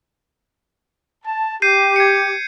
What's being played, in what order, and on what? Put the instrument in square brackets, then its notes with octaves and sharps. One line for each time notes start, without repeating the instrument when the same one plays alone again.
[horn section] A5
[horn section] G4 [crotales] G6 C7 D#7
[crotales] G#6 C7 C#7